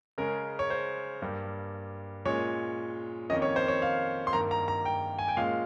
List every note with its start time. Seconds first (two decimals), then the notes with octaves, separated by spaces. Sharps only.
0.18 C#3 G#3 C#4 A#4
0.59 C#5
0.70 C5
1.22 G2 G3 A#3
2.25 A#2 G#3 C#4 C#5
3.30 F2 D#3 A#3 C#4 D#5
3.42 C#5
3.56 C5
3.68 C#5
3.82 F5
4.27 C6
4.33 G2 D#3 A#3 A#5
4.51 A#5
4.68 A#5
4.85 G5
5.19 G#5
5.28 G5
5.37 A#2 G#3 C#4 F5